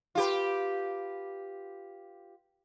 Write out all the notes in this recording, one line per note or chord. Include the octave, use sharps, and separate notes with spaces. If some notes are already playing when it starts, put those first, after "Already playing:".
F4 G4 B4